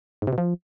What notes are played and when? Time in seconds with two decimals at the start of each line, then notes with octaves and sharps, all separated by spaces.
0.22 G#2
0.27 C3
0.33 B2
0.38 F3